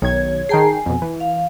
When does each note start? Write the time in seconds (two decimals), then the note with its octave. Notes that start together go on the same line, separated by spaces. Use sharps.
0.02 B1 D#3 C#5 G#6
0.49 D#3 G#4 G5 A5 A#5 C7
0.61 G#5
0.86 F2 B2
1.02 E3
1.20 F5